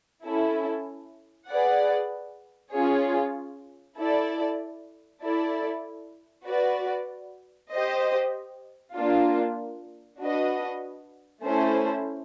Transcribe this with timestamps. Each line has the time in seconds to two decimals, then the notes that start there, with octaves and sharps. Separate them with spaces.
0.24 C#4 E4 A4
1.49 G#4 B4 D5 F#5
2.73 C#4 F4 G#4 C#5
3.97 E4 A4 D5
5.22 E4 A4 D5
6.46 F#4 B4 D5
7.70 G4 C5 D#5
8.95 A#3 D4 F4
10.19 D4 F#4 B4 D#5
11.44 A3 C#4 E4 A4 C5